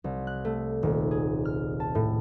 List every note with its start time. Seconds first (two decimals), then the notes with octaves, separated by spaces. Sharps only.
0.04 C2
0.27 F#6
0.45 A3
0.83 D#1
1.11 G#4
1.45 F6
1.80 A5
1.95 A2